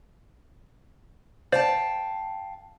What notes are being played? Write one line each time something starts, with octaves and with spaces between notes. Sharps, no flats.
C5 D5 F5 G5 A5